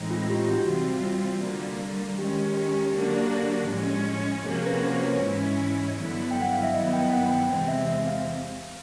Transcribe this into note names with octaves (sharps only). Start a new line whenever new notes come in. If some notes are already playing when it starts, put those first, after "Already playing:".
Already playing: A2 E3 G#3 C4 D#4
F4
G4
F#4
C3 E3 G3 C4 F4 F#4
D3 G3 A#3
D#3 G#3 C#4 G4
G4
D3 F#3 A#3 D4 F#4
A2 F3 G#3 C#4
C3 F3 A#3 C#4 F#4 G#4
B4
C5
C#5
G#2 E3 G#3 C#4 E4
G2 D3 F#3 B3 E4
G5
F#5
F5
E5
G2 D#3 F#3 B3 E4 D#5
G5
F#5
G5
E2 C3 E3 G#3 C4
E5
E5
F5